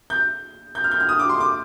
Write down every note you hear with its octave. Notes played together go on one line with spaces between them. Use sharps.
G6
G6
F6
G6
F6
D#6
D6
C6
D6